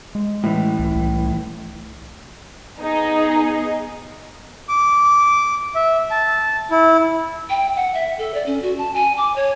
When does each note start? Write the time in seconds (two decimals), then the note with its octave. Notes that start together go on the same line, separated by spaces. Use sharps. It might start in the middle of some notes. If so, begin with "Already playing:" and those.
0.15 G#3
0.44 A2 E3
0.79 C#2
0.96 C2
2.79 B3 D#4 G#4
4.69 D6
5.75 E5
6.11 A5
6.71 E4
7.50 G5
7.76 F#5
7.94 E5
8.18 A4
8.34 D5
8.46 C#4
8.62 F#4
8.78 A5
8.94 G#5
9.18 D6
9.36 C#5